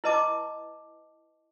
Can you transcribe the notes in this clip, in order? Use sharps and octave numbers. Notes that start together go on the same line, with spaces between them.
E4 B4 D#5 A5 D6